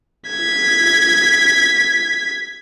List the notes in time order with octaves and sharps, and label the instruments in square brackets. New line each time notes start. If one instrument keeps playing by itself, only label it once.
[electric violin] G#6 B6